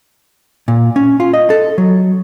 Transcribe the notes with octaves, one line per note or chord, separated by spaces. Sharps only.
A#2
C#4
F4
D#5
A4
F#3